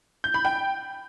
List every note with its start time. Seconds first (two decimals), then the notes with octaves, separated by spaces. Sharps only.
0.24 G6
0.34 B5
0.45 G5